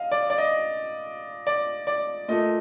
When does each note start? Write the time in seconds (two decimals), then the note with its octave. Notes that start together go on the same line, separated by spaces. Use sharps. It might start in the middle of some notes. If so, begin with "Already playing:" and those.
Already playing: D#5 F5
0.12 D5
0.30 D5
0.38 D#5
1.47 D5
1.87 D5
2.28 A#2 A3 D#5